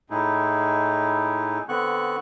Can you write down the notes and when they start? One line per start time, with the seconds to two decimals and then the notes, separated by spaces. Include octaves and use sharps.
0.10 A2 G#3 D#4 E4
1.69 D3 B3 C4 C#6 F#6